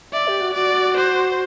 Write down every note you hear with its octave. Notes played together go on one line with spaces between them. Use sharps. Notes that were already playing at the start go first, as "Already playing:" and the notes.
D5 E5
G4
F#4
F#4 D5
C5